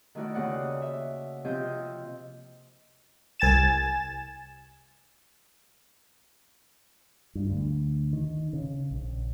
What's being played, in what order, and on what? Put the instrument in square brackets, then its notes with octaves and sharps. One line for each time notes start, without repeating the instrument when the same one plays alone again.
[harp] D#3 A3 E4 F#4 A#4 D5
D#2 C#3 A#3 D5 F#5 D#6
E5
C3 F3 C4 F4 D#5 G6
[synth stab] C2 G#5 A6 E7
[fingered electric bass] G2
D2
D#3
C#3
A#1